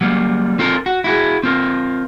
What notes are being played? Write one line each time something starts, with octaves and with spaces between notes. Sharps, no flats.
F#3 G3 A#3
C4 F4 A4 A#4
F#4
E4 F#4 G#4
C4 F4 A#4